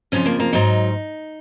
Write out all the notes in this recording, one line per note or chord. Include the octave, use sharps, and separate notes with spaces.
F2 C#3 F3 C#4
A#3
A#3
G#2 F#3 D#4